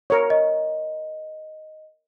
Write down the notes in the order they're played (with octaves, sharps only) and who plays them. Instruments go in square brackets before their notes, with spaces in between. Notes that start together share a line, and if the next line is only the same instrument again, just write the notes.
[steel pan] A#4 C#5
[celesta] D#5